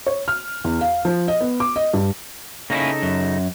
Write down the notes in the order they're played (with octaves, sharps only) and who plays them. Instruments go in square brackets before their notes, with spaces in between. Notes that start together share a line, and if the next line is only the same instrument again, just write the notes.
[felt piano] C#5
F6
E2
F5
F3
D#5
B3
D6
D#5
G2
[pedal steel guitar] C#3 D#4 A4 [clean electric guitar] A#3 C#4 E4
[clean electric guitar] F#2